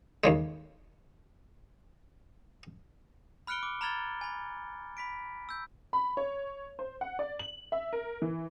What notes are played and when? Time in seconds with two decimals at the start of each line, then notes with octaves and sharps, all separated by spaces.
0.24 D#2 C#3 G#3
3.47 B5 F6 F#6 C#7 D7 G7
3.63 D6
3.81 A#5 B5 F6 G#6 A6 G7
4.21 G#5 B5
4.97 B5 B6 D7
5.49 E6 G6
5.93 B5
6.17 C#5
6.79 C5
7.01 F#5
7.19 D5
7.39 F#7
7.72 E5
7.93 A#4
8.22 E3